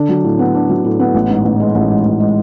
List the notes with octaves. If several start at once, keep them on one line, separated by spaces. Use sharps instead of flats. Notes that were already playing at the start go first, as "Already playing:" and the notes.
Already playing: D3 D4
F#3
A2
B3
D4
F#3
A2
B3
A1
G#2
A1
G#3
A1
G#2
A1
G#3